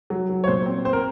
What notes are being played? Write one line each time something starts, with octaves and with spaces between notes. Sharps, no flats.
F#3
F#3
C#5
A#2 C5
C4
C4 C5
A#4